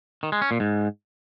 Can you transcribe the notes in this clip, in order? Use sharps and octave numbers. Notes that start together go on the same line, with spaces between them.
D#3
G#3
C#4
A#2
G#2